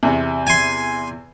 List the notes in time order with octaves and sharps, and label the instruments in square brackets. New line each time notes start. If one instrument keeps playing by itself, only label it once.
[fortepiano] E2 C3
[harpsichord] G#5 C6